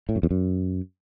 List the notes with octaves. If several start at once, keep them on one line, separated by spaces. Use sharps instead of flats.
A2
F#2
E2
F#2